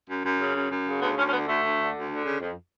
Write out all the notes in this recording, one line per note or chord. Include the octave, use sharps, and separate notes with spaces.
F#2
F#2
C#3
F#2
F#2
C#3
D2 B3
D2 C#4
C#4
D3 B3
D2 A3
D2
D3
D2
D3
C#3
F2